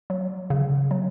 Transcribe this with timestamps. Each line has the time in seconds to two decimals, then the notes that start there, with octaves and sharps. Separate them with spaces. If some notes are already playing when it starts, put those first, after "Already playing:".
0.10 F#3
0.50 C#3
0.91 F#3